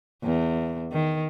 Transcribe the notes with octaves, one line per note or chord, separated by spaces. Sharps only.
E2
D#3